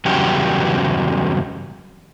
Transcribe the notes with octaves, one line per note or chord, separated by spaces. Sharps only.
E2 G2 C#3 F#3 G4